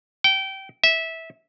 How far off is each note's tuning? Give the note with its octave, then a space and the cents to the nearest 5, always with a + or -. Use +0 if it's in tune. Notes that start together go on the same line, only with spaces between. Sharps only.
G5 -20
E5 -15